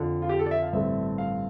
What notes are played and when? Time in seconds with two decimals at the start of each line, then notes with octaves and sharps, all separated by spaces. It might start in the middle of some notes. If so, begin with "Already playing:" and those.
Already playing: F2 D3 F3
0.22 F4
0.29 G4
0.39 A4
0.46 D5
0.51 E5
0.62 F5
0.73 A1 G2 D3 A3 C4 E5
1.18 F5